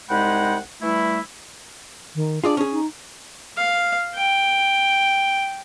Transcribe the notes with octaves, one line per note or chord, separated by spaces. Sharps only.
C2 G#3 D#4 F#5 G5 B5
E3 G3 A3 E4
D#3
D4 F4 G#4 D5
C#4 G#4
D#4
F5
G5